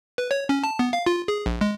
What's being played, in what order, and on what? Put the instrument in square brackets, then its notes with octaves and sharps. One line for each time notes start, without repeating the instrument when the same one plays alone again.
[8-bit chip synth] B4
C#5
C#4
A5
B3
F5
F4
G#4
A#1
G#3